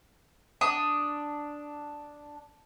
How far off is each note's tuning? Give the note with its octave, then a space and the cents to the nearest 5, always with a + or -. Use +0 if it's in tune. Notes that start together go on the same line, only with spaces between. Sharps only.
D4 +0 D#6 +0